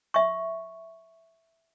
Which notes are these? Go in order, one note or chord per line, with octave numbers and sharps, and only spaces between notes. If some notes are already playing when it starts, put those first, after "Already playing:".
E5 C#6